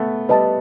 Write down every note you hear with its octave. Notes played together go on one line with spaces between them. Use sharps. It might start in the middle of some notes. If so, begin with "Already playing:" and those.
Already playing: A3 B3
G3 B4 D#5 A5